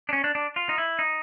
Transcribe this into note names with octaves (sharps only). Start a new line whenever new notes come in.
D4
C#4
D4
D4
F4
D#4
E4
D#4